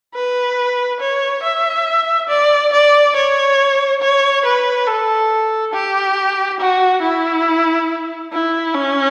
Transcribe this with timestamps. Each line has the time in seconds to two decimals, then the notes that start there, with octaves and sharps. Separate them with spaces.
0.15 B4
1.00 C#5
1.44 E5
2.29 D5
2.72 D5
3.16 C#5
4.02 C#5
4.45 B4
4.87 A4
5.73 G4
6.60 F#4
7.02 E4
8.32 E4
8.74 C#4